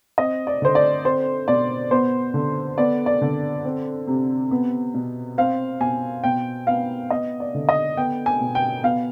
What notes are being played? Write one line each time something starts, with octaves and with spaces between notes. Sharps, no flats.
C4 D#5
D5
D3 C5
D5
C4 C5
B2 D5
B3 C5
D3
B3 D5
D5
D3
C4
C3
B3
B2
C4 F5
B2 G#5
B2 G5
B3 F5
B3 D#5
D5
D3
D#5
B3 G5
G#5
B2
G5
B3 F5